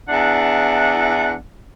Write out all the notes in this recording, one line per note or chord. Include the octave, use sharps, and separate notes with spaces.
E2 D4 E4 F#5